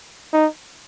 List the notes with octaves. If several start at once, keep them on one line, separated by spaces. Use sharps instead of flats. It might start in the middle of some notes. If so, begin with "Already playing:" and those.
D#4